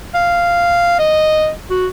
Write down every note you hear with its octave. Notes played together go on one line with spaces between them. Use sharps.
F5
D#5
F#4